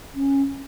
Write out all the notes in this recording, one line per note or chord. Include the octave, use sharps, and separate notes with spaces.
C#4